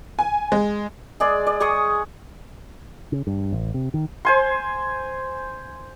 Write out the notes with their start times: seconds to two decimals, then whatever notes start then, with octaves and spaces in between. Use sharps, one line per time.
0.19 G#5
0.52 G#3
1.20 G#3 G#4 D5
1.47 D5
1.60 G#4 G#5 C#6 D#6
3.12 C#3
3.27 G2
3.53 A1
3.74 C3
3.94 D#3
4.25 C5 G#5 C6